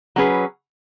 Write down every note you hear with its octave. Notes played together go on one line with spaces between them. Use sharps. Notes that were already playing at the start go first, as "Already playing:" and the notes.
F#3 C#4 G#4 B4